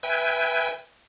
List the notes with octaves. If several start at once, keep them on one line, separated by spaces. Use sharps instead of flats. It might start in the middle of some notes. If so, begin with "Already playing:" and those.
B4 E5 G5 G#5